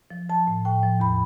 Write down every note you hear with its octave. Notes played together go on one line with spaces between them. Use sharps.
F3
F3 A5
A2
A2 G5
F3
E2 B5